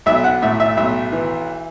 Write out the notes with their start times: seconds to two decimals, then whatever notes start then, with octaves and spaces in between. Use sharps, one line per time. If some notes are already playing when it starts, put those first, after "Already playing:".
0.06 B1 E5
0.24 F#5
0.42 A2 E5
0.60 E5
0.77 B1 E5
1.12 E3